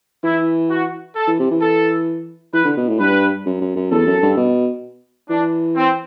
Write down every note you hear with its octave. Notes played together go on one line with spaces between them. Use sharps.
E3 E4
F#4
A4
E3
C3
E3
A4
E3 B4
D3
B2
A2
G2 B4
F#2
F#2
F#2
E2 A4
F#2
G2
B2
E3 D4
C4